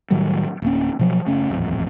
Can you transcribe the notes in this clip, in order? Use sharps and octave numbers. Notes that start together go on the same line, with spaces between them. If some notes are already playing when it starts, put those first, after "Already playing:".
A2 D#3 F#3 G3
D1 A#3 C#4
B2 F3 F#3
F#1 C#3 A3 C#4
D#1 A1 F2